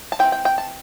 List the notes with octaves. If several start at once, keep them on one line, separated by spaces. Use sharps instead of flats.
A5
E3 C4 E4 G5
G5
G5
A5